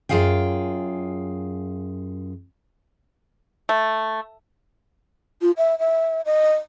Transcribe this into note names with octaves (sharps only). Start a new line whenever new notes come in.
F#2 F#3 F4 G#4 F5 G5
A3
F4
E5
E5
D#5